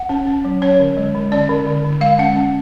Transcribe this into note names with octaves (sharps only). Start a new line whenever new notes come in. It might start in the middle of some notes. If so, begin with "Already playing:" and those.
Already playing: F#5
C#4
C#4
F#3
C#4 C#5
D3
G#3
D3
C#4 D5
D3
D3
D3
G#3 F5
C#4 F#5
C#4